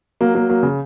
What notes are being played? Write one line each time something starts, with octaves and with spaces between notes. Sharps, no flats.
F#3 A#3
F#3 A#3
F#3 A#3
C#3